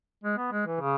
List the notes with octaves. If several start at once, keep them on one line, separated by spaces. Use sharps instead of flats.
G#3
B3
G#3
E3
C#3